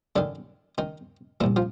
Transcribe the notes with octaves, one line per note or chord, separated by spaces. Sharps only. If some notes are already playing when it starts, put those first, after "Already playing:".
F#2 D3 D#3 D4
D#3 D#4
C2 A#2 E3 E4
F3 F4